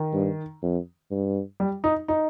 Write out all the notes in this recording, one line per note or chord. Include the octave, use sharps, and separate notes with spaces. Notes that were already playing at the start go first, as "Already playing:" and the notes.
Already playing: D#3
G2
F2
G2
G3
D#4
D#4